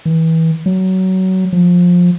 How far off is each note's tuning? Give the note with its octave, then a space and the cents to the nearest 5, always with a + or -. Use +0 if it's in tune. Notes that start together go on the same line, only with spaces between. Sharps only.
E3 -25
F#3 +20
F3 +20